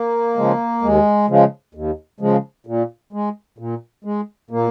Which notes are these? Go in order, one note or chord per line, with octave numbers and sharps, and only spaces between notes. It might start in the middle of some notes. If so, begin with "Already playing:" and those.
Already playing: A#3
C#3 F3 G#3
D#2 G#3
C#3 F3 G#3
D#2
C#3 F3 G#3
A#2
G#3
A#2
G#3
A#2 A#3